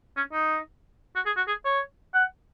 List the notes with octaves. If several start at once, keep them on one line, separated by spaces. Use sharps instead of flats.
C#4
D#4
F#4
G#4
F#4
G#4
C#5
F#5